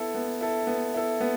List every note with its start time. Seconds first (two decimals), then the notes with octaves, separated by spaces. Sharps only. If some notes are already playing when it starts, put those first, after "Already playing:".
Already playing: B3 E4 A4
0.15 B3
0.41 E4 A4
0.67 B3
0.94 E4 A4
1.21 B3